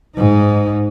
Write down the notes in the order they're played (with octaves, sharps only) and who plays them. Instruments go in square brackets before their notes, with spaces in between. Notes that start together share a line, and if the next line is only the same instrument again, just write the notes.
[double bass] G#2 D#4